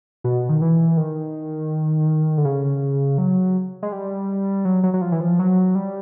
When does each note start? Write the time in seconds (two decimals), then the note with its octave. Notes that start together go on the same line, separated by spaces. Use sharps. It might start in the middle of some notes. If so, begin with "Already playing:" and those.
0.24 B2
0.49 D#3
0.62 E3
0.97 D#3
2.38 D3
2.45 C#3
3.18 F#3
3.83 G#3
3.92 G3
4.65 F#3
4.83 F#3
4.94 F#3
5.01 F3
5.12 E3
5.20 F3
5.39 F#3
5.75 G3